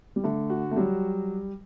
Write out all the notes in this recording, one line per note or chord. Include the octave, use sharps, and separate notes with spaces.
G3
D3 A3
F#4
A3
F#3 G3